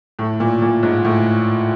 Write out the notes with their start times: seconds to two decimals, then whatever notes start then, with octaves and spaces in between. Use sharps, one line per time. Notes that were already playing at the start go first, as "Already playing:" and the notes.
0.19 A2
0.40 A#2
0.62 A#2
0.83 G#2
1.05 A2